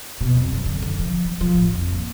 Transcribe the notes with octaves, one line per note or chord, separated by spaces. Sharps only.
B2
F2
F#2
D3
D3
F3
F#3
F3
A1
F2
A#3